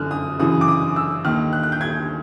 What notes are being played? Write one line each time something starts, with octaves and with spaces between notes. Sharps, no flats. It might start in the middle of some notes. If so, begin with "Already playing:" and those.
Already playing: F#2 D3 F6 F#6
D#6
F#2 C#3 E3 D#6
D6
D#6
E6
D#2 D#3 F6
F#6
F#6
G6
G#6